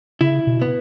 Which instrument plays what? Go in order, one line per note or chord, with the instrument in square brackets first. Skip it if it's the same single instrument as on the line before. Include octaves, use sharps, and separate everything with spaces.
[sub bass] C#3 [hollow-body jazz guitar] E4
[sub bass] B2
[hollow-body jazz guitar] B3